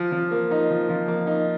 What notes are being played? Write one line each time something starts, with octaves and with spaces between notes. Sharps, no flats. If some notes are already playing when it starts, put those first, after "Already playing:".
Already playing: F3
F3
A#3
D#4
F3
F3
A#3
D#4